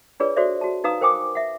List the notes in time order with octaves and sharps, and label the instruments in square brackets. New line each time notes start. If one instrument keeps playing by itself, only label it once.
[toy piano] D4 F4 G#4 B4 C#5 D5
F#4 A4 C5 D5 E5
F#4 A5
D#4 B4 F5 A#5 D#6
A#4 C5 G5 G#5 D6 D#6
E5 F#5